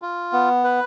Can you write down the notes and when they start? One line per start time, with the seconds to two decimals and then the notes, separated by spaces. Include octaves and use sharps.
0.02 F4
0.33 B3
0.64 B4